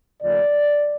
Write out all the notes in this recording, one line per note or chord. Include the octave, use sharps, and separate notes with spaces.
D#2 C#3 F3 A3 D5